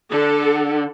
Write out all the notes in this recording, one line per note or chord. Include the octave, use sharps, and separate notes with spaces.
D3 A4